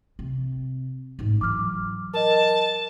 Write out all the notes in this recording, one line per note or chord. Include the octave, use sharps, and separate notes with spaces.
C3
A1 G#2
E3 F#3 D6 F6
A#4 D#5 A5